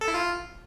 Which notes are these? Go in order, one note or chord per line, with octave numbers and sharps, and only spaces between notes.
A4
E4
F4